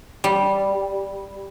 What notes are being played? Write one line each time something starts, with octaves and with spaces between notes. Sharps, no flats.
G3